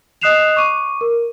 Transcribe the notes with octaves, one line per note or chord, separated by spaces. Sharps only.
D#5 D#6 F#6 C7 E7 F7
C#6 D6 D#7
A#4